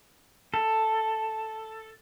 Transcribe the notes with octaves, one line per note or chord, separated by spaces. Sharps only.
A4